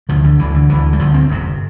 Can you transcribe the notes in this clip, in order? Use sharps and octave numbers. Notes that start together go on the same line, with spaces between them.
D2 D3 F3
D3
D2 D3 E3
D3
D2 D3 E3
G3
D2 D3 F3
C4
G1 F2 C3